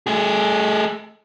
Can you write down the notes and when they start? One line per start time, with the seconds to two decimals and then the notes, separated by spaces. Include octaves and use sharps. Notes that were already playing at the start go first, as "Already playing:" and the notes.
0.07 A3 G#4